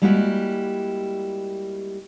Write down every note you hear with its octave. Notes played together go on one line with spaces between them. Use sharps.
G3 G#3 A#3 E4 F#4 G4